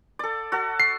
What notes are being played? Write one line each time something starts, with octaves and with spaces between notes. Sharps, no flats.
A4 D5
F#4 A4
C7